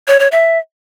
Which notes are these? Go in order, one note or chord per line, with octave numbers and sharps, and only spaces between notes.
C#5
C#5
E5